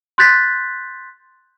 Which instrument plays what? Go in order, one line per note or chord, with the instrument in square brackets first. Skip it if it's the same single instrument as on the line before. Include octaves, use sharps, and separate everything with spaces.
[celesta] C6 F#6 G6 A6 B6